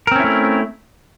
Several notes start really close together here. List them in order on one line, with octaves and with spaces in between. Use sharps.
A#4 C4 C#4 E4 A3